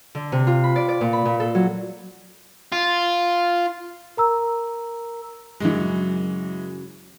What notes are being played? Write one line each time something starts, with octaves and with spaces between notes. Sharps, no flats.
D3
C3
F4
B5
D5
D5
A#2
B5
A#2
A4
F#3
F4
A#4 A#5 E6
F#2 C#3 E3 F#3 G#3